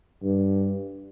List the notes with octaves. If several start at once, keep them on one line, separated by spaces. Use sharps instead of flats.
G2